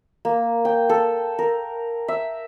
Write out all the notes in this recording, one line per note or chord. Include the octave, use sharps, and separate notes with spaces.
A#3
G5
A4
A#4
E5